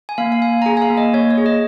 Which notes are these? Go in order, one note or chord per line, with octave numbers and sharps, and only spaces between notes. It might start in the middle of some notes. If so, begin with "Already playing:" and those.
G#5
A#3 F5
F5
A#3 G#5
A#5
G#4 G#5
G#5
F5
A#3
D#5
A#3 C#5
C#5
G#4
D#5